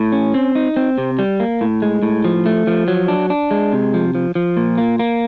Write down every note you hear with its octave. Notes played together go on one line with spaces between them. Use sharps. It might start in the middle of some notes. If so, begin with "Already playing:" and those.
Already playing: A2
C#4
C4
D#4
C4
C3
G3
A#3
A2
G#3
A2
F3
A3
F3
F#3
D4
D4
G#3
C3
F3
F3
F3
A#2
A#3
A#3